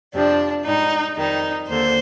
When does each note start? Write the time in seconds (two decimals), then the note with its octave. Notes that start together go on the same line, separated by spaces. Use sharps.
0.13 F2 C3 F3 D4
0.65 G#2 G3 D#4
1.17 F2 D#3 G3 D#4
1.69 D#2 D3 C5